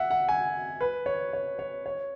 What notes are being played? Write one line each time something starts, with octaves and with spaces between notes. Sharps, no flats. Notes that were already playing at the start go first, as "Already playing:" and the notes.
Already playing: E5 F#5
F#5
G#5
B4
C#5
C#5
C#5
C#5